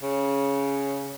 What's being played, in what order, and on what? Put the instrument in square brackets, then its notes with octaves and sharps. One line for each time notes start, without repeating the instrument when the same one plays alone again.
[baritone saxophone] C#3